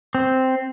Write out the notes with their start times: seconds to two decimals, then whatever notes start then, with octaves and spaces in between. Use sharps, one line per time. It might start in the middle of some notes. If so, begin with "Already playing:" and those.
0.15 C4